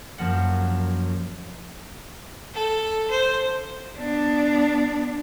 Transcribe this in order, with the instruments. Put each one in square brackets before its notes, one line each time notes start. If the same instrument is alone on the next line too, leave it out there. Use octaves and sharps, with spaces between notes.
[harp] F#2 F3 A#3 F#5
[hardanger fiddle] A4
C5
[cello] B3 D4